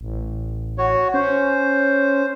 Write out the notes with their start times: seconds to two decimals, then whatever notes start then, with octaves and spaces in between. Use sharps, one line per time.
0.01 A1
0.78 F#4 C#5
1.14 C#4 C5